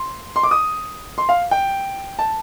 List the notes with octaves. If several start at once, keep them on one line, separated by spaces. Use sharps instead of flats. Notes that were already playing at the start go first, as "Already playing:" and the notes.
Already playing: C6
C6
D6
D#6
C6
F5
G5
A5